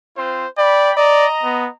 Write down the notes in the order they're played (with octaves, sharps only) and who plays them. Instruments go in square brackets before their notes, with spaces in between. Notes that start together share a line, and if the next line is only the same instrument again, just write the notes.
[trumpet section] C4 F4 C5
[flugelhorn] D5 [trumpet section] G5 B5
[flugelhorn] D5 [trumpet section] D#5 A#5
[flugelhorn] B3